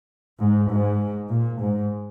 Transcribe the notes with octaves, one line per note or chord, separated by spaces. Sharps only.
G#2
G#2
A#2
G#2